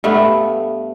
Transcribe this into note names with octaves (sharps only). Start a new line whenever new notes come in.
G2 A3 B3